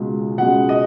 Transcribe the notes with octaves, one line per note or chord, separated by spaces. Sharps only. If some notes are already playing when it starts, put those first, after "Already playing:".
Already playing: C#2 B2 G#3
C#2 B2 G#3 F#5
D#5